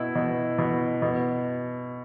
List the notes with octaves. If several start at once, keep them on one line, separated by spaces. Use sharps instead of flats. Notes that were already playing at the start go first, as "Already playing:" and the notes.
Already playing: B2 E4
B2
B2
B2